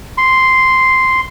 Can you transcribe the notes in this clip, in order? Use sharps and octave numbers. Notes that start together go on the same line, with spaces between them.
C6